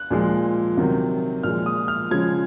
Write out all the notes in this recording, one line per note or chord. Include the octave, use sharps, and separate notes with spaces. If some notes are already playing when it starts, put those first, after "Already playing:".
Already playing: F#6
A#2 F3 G#3
C3 D#3 F#3
A#2 F3 G#3 F6
D#6
F6
C#3 F3 G#3 G#6